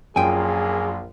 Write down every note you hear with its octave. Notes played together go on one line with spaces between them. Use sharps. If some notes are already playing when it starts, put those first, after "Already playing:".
A#1 F#2 A#2 F4 G#4 G5 G#5